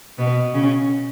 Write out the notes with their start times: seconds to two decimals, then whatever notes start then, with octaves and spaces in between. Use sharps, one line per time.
0.19 B2 B3
0.54 C#3 C#4